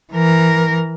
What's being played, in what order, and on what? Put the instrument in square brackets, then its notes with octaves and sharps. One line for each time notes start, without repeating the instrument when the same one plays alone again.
[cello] E3 A#4